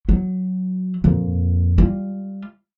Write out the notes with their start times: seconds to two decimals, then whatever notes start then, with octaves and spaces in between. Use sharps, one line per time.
0.09 F#3
1.04 F2 A#2
1.78 G3 F4